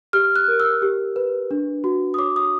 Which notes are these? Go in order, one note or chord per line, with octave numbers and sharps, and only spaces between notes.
G4 F6
F#6
A#4
E6
G4
B4
D4
F#4
D#6
C#5 D6
D#6